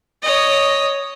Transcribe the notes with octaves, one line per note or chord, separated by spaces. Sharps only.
C#5 D#5